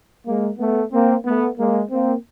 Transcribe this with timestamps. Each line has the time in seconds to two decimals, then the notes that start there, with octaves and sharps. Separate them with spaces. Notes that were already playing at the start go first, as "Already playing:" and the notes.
0.26 G#3 A#3
0.59 A3 B3
0.92 A#3 C4
1.25 A3 B3
1.58 G#3 A#3
1.91 A#3 C4